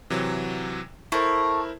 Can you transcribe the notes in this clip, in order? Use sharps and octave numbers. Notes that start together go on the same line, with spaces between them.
C3 E3 F#3
A3 E4 A#4 C5